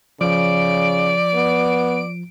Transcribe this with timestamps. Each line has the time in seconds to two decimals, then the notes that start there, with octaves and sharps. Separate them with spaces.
0.21 C#3 F3 D5 D7
1.34 B3